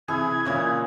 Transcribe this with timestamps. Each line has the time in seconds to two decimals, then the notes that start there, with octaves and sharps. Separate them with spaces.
0.08 C3 E3 E4 G#4 G#6
0.45 A#2 C#3 E3 E4 C#5 D#5